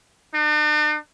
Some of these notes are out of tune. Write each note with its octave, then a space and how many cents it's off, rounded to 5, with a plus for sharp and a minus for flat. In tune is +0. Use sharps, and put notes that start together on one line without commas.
D4 +45